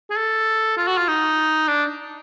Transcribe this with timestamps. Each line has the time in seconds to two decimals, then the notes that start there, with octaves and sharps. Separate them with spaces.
0.10 G#4
0.17 A4
0.77 F4
0.88 F#4
0.97 F4
1.08 D#4
1.68 D4